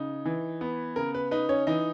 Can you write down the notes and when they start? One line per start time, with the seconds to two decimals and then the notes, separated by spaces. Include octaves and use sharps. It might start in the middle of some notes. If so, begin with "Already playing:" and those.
Already playing: C#3 D#4
0.25 E3
0.61 B3
0.96 C#3 A#4
1.14 B4
1.31 D#4 B4
1.49 C#4 C#5
1.67 E3 D#4 D#5